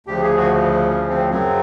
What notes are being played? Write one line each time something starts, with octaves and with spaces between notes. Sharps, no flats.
D2 C#3 F3 G4
G#4
F#4
C#4
C4
F#2 C#3 F#3 C4